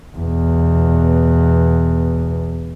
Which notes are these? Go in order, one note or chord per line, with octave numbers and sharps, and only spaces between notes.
E2 B2